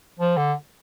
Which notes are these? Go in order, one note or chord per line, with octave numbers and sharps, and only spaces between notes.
F3
D3